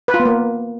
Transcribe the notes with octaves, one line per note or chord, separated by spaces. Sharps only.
B4
F4
B3
A#3